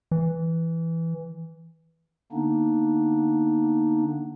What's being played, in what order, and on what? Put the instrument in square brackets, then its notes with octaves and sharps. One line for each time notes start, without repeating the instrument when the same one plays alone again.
[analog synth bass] E3
[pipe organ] D3 A#3 B3 D4 D#4